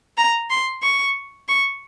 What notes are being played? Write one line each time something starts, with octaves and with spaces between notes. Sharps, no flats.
A#5
C6
C#6
C#6